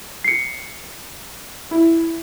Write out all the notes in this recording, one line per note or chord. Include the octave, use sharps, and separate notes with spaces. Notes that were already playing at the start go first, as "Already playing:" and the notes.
C7 C#7
E4